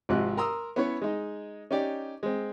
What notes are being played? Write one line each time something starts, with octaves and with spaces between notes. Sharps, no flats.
G#1 G#2 C3 F3 D#5 F#6
A#4 A#5 C6 D#6 E6
B3 C#4 E4 B4 C#5
G#3 D#4
C#4 D#4 G4 D5
G#3 C4